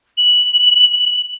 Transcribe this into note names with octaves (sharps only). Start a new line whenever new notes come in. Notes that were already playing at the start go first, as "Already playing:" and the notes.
F#7